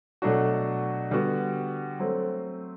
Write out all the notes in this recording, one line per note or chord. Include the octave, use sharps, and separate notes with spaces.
B2 F#3 A3 D4 F#4
D3 G3 B3 F#4
F#3 A3 C4